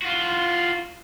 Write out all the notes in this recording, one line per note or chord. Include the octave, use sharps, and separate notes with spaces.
F4 F#4